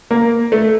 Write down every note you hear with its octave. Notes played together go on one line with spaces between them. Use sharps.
A#3
A3